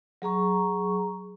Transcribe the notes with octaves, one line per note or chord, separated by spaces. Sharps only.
F#3 G#4 A#5 C#6